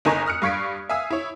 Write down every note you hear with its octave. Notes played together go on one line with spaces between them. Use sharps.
F#1 D#4 A#4 G#5 A#5 C#6
D#6 F6 F#6 C#7
G2 F5 C#6 G#6 B6 D7
E5 F5 G#5 D#6 E6
E4 C#5